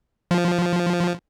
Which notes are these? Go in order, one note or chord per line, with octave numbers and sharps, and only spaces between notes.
F3